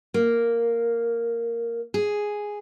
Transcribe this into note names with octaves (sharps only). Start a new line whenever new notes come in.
A#3
G#4